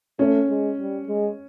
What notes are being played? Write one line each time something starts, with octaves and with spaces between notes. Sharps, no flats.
A3 C#4
G#3
G3
G#3